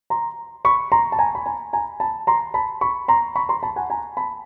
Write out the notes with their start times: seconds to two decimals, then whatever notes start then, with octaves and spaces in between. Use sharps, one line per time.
0.10 A#5 C6
0.65 B5 C#6
0.92 A#5 C6
1.12 A5
1.19 G#5 A#5
1.35 B5
1.46 G#5 A#5
1.73 G#5 A#5
2.00 A5 B5
2.27 A#5 C6
2.54 A5 B5
2.81 B5 C#6
3.08 A#5 C6
3.36 B5 C#6
3.49 A#5 C6
3.63 A5 B5
3.76 F#5 G#5
3.90 G#5 A#5
4.17 A5 B5